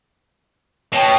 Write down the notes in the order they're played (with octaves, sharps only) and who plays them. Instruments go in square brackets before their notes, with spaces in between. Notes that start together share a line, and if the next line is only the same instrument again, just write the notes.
[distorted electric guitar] B2 [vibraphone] C#5 G5 A5